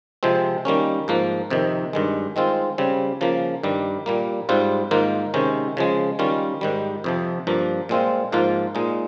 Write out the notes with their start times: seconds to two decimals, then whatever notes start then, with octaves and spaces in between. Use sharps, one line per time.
0.23 C3 F3 G#3 C4
0.65 D#3 G3 A#3 C#4
1.08 G#2 F3 A#3
1.50 F2 C3 D#3
1.93 G2 D#3 G#3
2.36 D#3 G#3 C4 F4
2.78 C#3 G3 C4
3.21 C#3 F3 A#3
3.63 G2 D#3 G3
4.06 A#2 G3 A#3
4.49 G#2 G3 C4 F4
4.91 G#2 D#3 A#3 F4
5.34 C3 D#3 G#3 C#4
5.77 C#3 F3 G#3
6.19 D#3 G3 C#4 F4
6.61 G#2 D#3 G3
7.04 F2 C3 F3
7.47 G2 F3 A#3
7.89 A#2 G#3 C4 F4
8.32 G#2 F3 A#3 F4
8.75 A#2 G#3 D#4